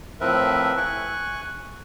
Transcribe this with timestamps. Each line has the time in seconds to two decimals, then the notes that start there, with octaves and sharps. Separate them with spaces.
0.21 A2 F3 C4 A#4 B4 E5
0.77 G#5 C#6 F#6